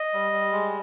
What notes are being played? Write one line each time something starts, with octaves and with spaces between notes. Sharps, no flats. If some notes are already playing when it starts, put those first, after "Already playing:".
Already playing: D#5
G3
G3
G#3